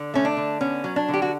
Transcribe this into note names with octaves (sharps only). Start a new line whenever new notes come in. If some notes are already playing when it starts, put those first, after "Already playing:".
Already playing: D3
A3 C#4
D4
D3
B3 C#4
F#3
D4
D3
G4
F#4